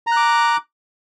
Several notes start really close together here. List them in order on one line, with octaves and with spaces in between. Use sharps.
A#5 F#6 D6